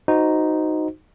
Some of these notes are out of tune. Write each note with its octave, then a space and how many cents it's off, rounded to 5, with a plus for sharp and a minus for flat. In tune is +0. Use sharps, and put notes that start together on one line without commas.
D#4 +0 F#4 +0 C5 -15